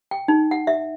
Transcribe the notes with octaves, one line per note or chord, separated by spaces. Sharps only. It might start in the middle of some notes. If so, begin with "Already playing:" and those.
G5
D#4
F#5
E5